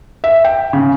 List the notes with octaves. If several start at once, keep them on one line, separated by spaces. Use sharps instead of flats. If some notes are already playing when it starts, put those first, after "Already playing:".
E5
G5
C#3